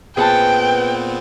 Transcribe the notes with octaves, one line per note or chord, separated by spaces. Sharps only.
A#2 B3 C4 G#4 B4 F#5 G5 A5